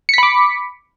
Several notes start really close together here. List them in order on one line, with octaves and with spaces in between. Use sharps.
C#7 B6 B5 D6